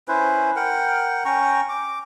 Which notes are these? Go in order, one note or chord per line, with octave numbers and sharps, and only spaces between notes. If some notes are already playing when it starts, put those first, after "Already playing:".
C#4 E4 B4 C5
A#4 F#5 G5
C#4 G5 A#5 C#6
D6